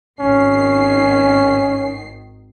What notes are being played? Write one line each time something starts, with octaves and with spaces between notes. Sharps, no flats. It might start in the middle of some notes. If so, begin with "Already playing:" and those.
G#1 D#3 C#4 C7